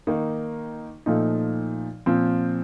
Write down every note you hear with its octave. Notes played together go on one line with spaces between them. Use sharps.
D#3 A#3 D#4
A#2 F3 A3 D#4
A#2 F3 C4